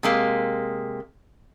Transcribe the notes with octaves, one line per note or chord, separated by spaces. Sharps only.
C3 G#3 A#3